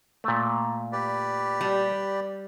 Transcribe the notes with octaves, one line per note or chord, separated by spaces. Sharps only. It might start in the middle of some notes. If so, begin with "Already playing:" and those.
A#2 A3
G4 B4 D5
G3